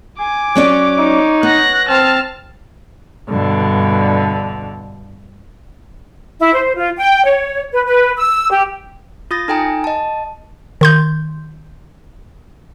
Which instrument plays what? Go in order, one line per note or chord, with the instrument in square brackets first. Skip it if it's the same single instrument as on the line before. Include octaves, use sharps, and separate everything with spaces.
[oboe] G#5 [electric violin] D6
[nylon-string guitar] F#3 C#4 D5 [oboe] C#5
[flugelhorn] D#4
[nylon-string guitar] B3 [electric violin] F#6 A#6
[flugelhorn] C4 [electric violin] A5 F6
[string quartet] G2 B2 D3
[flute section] E4
C5
F4
G5
C#5
B4
B4
E6
G4
[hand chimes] F4 D#6 A6 A#6
D#4 A4 G5 G#5 A#5
D#5 A5
[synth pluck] D#3 C6 G6